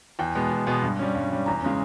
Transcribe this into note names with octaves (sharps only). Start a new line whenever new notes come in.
E2 G5
B2 G#3 B3
E2
B2 G#3 B3
G2
G3 C#4
G2
G3 C#4
E2 A#5
C#3 G#3 C#4